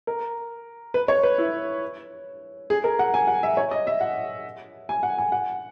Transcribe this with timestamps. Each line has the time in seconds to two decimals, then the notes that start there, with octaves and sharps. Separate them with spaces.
0.07 A#4
0.94 B4
1.08 C#5
1.23 B4
1.38 E4
2.70 G#4
2.84 A#4
2.99 F#5
3.14 G#5
3.27 F#5
3.43 E5
3.57 C#5
3.71 D#5
3.87 E5
4.01 F#5
4.89 G#5
5.03 F#5
5.18 G#5
5.32 F#5